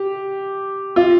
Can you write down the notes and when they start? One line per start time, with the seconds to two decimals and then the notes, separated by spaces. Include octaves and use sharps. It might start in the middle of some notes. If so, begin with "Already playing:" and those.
Already playing: G4
0.96 F4